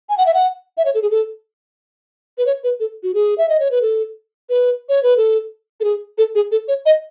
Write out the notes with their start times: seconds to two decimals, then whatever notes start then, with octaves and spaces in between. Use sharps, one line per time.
0.09 G#5
0.18 F#5
0.26 E5
0.34 F#5
0.77 E5
0.85 C#5
0.95 A4
1.02 G#4
1.11 A4
2.38 B4
2.46 C#5
2.64 B4
2.80 A4
3.03 F#4
3.14 G#4
3.38 E5
3.49 D#5
3.60 C#5
3.71 B4
3.82 A4
4.50 B4
4.89 C#5
5.03 B4
5.17 A4
5.80 A4
5.84 G#4
6.18 A4
6.35 G#4
6.52 A4
6.68 C#5
6.86 D#5